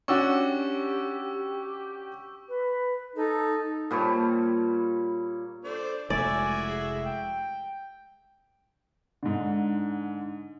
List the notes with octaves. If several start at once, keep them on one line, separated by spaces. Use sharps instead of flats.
C#4 D4 F#4 G4 C#6 E6
B4
D#4 A4
A#2 G3 C#5 A5
D4 A4 C5 D5
F1 G#3 A3 E4 F#4 D5 E5 G#5
G#4
G5
G#2 D3